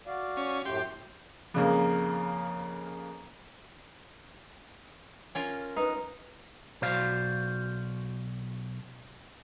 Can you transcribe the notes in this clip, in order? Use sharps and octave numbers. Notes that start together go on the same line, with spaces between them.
F#4 D5 F5
C#4
F#2 A2 A3 G4 C6
F2 C#3 A#3
C#4 F4 A#4
D#4 B4
B1 F#4 C5 D5 F5